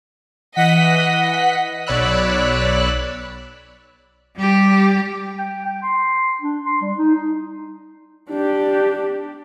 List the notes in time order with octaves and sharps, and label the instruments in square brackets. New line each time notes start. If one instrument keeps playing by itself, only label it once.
[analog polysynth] E3 F#5 B6 [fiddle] D#5
[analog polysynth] B1 C#5 D5 B5 E6 F#6
[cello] G3 G4
[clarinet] G5
G5
C6
D4
C6
G3
D#4
D#4
[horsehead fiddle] D4 G4